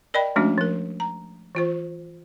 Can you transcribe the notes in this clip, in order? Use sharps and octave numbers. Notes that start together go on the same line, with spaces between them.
A#4 D5 D#5 G5 B5
F3 G#3 A3 C#4 D4 F#4
F3 A#4
A#5
E3 F4 C5